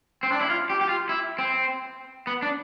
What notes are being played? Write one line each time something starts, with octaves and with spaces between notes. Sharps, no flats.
C4
D4
E4
F4
G4
G4
F4
E4
C4
B3
D4